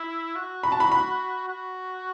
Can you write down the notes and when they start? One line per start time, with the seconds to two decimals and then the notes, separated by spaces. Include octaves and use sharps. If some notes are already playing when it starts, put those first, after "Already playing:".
Already playing: E4
0.36 F#4
0.63 B5
0.72 A5
0.80 B5
0.92 B5
1.49 F#4